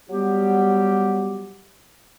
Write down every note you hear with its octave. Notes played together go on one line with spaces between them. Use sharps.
F#3 G3 B3 G4